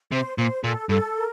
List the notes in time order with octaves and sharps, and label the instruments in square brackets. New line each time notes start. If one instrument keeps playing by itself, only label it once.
[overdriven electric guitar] C3 [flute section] C5
[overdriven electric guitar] A#2 [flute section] C5
[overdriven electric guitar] A#2 [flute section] A4
[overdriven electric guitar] G2 [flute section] A4
[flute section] A#4